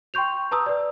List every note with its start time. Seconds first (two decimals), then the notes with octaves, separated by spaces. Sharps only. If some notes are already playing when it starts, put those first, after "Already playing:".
0.14 G5 C6 C#6 G6 F7
0.51 B4 A5 A#5 D#6 E6
0.66 B4 D5